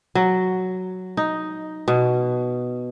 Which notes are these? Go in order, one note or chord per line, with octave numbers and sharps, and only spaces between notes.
F#3
D#4
B2